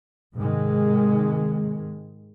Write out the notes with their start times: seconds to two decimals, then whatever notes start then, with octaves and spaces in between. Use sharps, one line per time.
0.34 G#2 C3 D#3 G#3